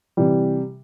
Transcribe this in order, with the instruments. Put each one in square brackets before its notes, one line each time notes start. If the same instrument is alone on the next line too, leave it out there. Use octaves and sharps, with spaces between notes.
[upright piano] C3 E3 G3